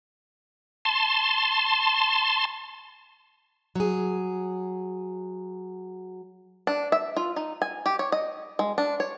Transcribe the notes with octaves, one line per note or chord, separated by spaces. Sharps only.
A5 C6
F#3 G#4
D4
E5
F4
D#4
G#5
G4
C#5
D#5
G#3
D4
C#5